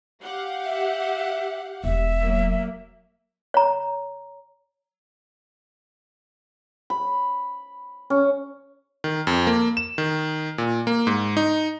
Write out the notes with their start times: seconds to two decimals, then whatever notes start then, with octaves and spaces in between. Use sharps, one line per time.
0.22 G4 F5 F#5
0.65 E5
1.84 E1 E5
2.19 F#3 A#3
3.54 C#5 A#5
6.90 B5
8.10 C#4
9.04 D#3
9.27 F2
9.47 A#3
9.77 E7
9.98 D#3
10.58 A#2
10.87 A#3
11.07 G#2
11.37 D#4